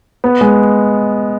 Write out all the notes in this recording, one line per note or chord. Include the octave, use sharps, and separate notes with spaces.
B3
G#3